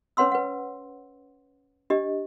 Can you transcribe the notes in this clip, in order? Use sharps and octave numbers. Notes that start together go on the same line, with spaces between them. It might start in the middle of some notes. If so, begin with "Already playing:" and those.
C#4 B4 C#5 F#5 C6 E6
B4 F#5
D4 G4 D#5